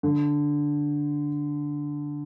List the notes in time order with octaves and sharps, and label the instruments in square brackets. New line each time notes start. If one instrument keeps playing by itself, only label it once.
[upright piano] D3